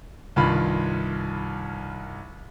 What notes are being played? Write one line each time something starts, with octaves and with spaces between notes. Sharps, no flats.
C2 G2 D#3 F4 B5